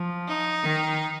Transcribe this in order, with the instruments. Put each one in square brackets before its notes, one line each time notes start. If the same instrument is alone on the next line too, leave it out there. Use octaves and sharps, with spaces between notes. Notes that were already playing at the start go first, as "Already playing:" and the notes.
Already playing: [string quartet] F3
[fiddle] D#4
[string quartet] D#3